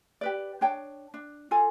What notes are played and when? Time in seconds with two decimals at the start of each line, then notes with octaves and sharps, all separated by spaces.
0.21 G4 B4 D5
0.61 D4 C#5 G5 A5
1.14 D4
1.51 F4 A4 G#5